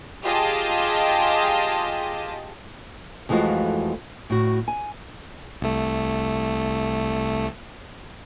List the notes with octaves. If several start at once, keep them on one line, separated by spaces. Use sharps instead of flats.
F4 G4 G#4 D#5 A5
F2 E3 G#3 A3 F4 F#4
A2 F#4
G#5
C2 A3